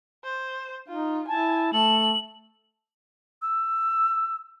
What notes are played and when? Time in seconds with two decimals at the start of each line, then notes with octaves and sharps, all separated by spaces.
0.24 C5
0.88 D#4 F4
1.28 E4 G#5 A5
1.73 A3 A4 F#7
3.42 E6